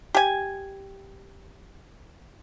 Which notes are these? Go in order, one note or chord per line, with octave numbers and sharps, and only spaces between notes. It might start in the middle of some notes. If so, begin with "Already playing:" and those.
G4 G#5